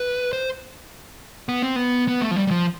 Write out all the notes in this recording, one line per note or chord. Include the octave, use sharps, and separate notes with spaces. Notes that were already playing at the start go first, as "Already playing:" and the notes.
Already playing: B4
C5
B3
C4
B3
B3
A3
F3
G3
G3
F3